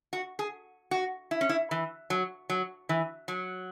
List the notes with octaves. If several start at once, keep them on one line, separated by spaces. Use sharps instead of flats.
F#4
G#4
F#4
E4
C#4
E4
E3
F#3
F#3
E3
F#3